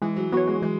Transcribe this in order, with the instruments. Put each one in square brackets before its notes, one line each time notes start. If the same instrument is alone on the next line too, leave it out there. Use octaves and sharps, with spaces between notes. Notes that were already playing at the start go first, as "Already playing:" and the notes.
[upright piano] E3 [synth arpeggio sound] G#3
[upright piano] F#3
[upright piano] F#3 [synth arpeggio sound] B3 F#4 C#5
[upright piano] G#3
[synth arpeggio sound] E3 [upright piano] G#3